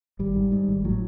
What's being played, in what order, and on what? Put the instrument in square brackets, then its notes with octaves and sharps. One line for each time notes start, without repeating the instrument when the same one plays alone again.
[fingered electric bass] G#1 G3
G#2
G#2
G#1
A2 F#3